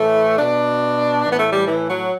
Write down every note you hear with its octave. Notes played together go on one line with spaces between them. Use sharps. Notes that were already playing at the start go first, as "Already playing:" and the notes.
Already playing: A2 E3 A3
B2 D4
A2 E3
B3
A3
G3
E3
F#3